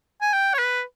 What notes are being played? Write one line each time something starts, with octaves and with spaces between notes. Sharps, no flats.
G#5
G5
C#5
B4